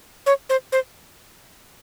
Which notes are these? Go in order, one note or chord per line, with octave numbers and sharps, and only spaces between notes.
C#5
C5
C5